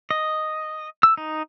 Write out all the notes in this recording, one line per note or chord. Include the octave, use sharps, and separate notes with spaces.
D#5
E6
D#4